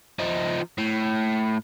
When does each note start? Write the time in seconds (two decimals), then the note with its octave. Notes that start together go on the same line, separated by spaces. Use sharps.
0.19 F3 D#4
0.78 A2